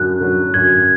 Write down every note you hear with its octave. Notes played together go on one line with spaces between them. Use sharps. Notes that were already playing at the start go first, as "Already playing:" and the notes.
Already playing: F#2 D3 F#3 F#6
D3 F#3
F#2 G#6